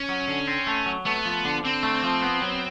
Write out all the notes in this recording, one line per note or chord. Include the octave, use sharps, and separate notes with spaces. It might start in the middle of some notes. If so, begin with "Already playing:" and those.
Already playing: C#4
F#3
D3
C4
A3
F#3
A3 B3
F3
D3
D3 C4
A3
F3
B3
F#3